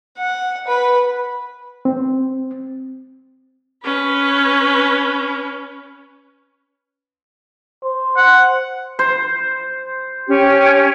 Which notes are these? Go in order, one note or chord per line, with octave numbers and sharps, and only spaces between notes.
F#5
B4 B5
C4
C#4 B4
C5
F#5
C5
C#4 G4